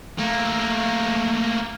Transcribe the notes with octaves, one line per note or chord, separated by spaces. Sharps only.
A3 A#3